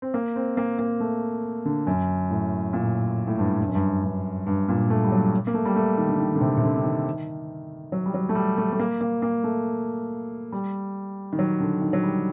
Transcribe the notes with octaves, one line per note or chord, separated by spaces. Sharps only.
C4
A#3
C4
A#3
A#3
A3
D3
F#2
A2
A#2
A2
G2
G2
F#2
G2
G2
G2
A#2
A3
G3
F#3
A#3
A3
G3
A3
D#3
D3
D#3
D3
C3
C3
D3
D3
D#3
F#3
G3
F#3
A3
G3
A3
A3
A#3
A#3
A#3
A3
G3
D#3
F#3
D3
D#3
F#3
G3